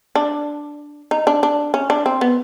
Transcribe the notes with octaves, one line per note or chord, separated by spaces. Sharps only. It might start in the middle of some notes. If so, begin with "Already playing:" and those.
D4
D#4
D4
D4
C#4
D4
C4
B3